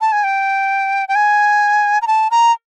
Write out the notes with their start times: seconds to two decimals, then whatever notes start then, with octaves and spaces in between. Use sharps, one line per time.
0.01 A5
0.12 G#5
0.24 G5
1.09 G5
1.15 G#5
2.02 A#5
2.07 A5
2.31 A#5